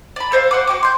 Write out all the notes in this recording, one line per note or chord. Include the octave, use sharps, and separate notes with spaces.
D5 B5
A4 C5 D#5 F5
C5 F#5 D6
F#4 G5 D6
C6 G6